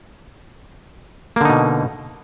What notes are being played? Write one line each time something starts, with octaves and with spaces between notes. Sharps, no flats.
B2 D3 A#3 D#4